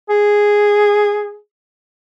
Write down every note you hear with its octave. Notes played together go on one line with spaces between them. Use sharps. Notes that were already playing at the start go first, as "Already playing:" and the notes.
G#4